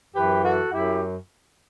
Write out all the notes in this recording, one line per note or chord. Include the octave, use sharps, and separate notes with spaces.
F#2 E3 G4 B4
F#4 A4
F#2 E4 G4